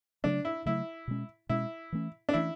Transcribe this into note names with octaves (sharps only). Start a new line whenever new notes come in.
C#3 F#3 A3 D4
E4
C#3 F#3 A3 E4
B2 G#3 C#4
B2 G#3 C#4 E4
E3 A3 C#4
D4
E3 A3 C#4 E4